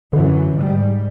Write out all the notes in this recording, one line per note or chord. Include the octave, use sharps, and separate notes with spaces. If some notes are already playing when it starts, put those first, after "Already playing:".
F#2 D3 E3
G#2 G3